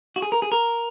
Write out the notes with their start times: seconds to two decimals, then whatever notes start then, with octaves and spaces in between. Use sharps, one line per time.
0.16 F#4
0.22 G#4
0.32 A#4
0.42 G#4
0.52 A#4